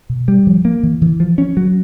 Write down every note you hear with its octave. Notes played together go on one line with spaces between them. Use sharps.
B2
G3
F3
A#3
E3
E3
F3
C#4
F#3